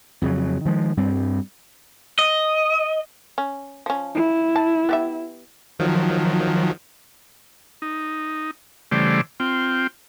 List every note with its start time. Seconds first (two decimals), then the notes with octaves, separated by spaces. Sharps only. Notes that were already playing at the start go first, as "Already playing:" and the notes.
0.22 F2 C#3 F#3
0.65 D#3 F3 G#3
0.97 G2 G3 C4
2.19 D#5
3.38 C#4
3.86 F3 C#4
4.14 E4
4.56 A5
4.89 B3 G4 E5
5.79 D#3 F3 F#3
7.82 D#4
8.91 C#3 E3 G3 A3 C5 D5
9.40 C4 F4 G5